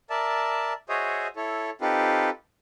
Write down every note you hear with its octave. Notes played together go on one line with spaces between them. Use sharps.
A#4 D5 E5 A5
F#4 G#4 C5 C#5 D#5 E5
E4 A4 C#5
C4 D#4 F4 G4 A4 B4